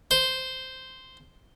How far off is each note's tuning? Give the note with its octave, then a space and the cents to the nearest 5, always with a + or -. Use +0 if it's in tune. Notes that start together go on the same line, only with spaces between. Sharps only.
C5 -5